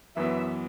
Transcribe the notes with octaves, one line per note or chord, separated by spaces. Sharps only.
F#2 E3 B3 E5